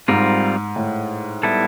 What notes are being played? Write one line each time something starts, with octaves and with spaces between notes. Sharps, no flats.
G#2 G3 C4 F4 A#4
A2
G3 B3 E4 A4